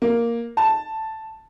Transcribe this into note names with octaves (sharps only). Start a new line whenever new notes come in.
A#3
A5